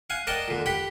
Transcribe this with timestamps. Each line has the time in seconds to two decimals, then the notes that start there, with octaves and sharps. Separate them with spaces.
0.10 F5 F#5 G#5
0.27 A#4 D5 D#5 F#5 G5 A5
0.48 A#2 D3
0.66 G4 F#5 G5 B5